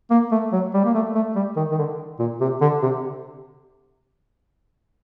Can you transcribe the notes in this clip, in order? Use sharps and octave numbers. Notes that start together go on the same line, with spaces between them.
A#3
A3
F#3
G3
A#3
A3
A3
G3
D#3
D#3
D3
A#2
C3
D3
C3